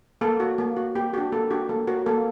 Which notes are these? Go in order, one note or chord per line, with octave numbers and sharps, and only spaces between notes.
A#3 A4
F#4
A#3
F#4
A#3 G4
D4 F#4 G4
A#3 A4
D4 F#4 G4
A#3 A4
F#4 A#4
A#3 A4